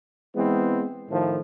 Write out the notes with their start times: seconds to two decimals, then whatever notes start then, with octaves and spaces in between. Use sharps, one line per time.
0.36 E3 G#3 B3 C4
1.09 A2 D#3 F3 A3